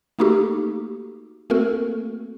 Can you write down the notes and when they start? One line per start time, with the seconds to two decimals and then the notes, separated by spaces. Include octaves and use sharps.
0.19 A3 A#3 D#4 F#4 G4 A4
1.50 A3 A#3 C4 F#4 A4 A#4